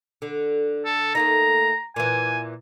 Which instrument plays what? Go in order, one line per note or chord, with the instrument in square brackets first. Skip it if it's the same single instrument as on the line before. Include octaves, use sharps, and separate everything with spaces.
[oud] D3
[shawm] A4
[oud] A3 A#3 D#4 [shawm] A#5
[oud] A#2 E3 [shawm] G#5